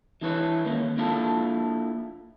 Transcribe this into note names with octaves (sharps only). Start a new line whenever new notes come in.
E3 D4 E4 B4 C#5
D#3 A#3 C#4
A#3 D4 E4 F4 A4